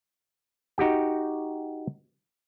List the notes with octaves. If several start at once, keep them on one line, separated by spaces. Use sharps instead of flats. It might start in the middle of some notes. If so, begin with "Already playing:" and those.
D#4 F#4 G4 G5